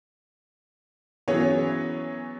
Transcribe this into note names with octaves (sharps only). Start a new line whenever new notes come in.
E3 F#3 B3 C#4 G#4 C#5